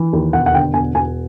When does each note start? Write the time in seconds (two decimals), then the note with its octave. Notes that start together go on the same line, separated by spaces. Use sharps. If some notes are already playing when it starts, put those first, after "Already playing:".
Already playing: E3
0.13 D#2
0.33 E1 F#5
0.46 F#5
0.53 D3 G5
0.74 E1 G#5
0.95 E1 G#5